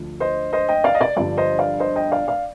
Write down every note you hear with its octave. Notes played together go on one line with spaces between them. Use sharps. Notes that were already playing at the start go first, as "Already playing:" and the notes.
Already playing: D2 D3 F3
C5 D#5
C5 D#5
D#5 G5
D5 F5
D#5
D5
G1 G2 F3 D5
C5 D#5
D5 F5
C5 D#5
D#5 G5
D5 F5
D5 F5